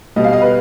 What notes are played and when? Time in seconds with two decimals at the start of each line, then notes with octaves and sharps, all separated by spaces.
0.16 B2 G3 D#5
0.24 F5
0.33 D#5
0.41 B4